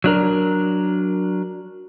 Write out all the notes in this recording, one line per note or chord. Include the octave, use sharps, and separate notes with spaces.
F#3 D4 A#4